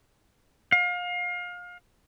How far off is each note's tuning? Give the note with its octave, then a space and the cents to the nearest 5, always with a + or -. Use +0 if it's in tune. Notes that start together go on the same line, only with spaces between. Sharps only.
F5 +30